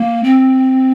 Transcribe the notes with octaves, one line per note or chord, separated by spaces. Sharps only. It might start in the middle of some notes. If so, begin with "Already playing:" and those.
Already playing: A#3
C4